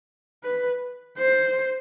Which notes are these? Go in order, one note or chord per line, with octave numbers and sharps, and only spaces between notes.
B4
C5